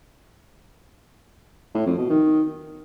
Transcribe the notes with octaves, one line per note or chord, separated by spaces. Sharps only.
A2
F2
B2
D#3